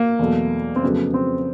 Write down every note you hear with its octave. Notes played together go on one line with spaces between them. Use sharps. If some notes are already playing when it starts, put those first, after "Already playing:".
Already playing: A#3
E2 B2 F#3 A3
C4
F2 C#3 F#3 A3 B3
C4